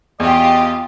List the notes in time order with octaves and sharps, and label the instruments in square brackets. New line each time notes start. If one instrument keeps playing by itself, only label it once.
[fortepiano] E2 [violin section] F4 G4 [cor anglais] D#5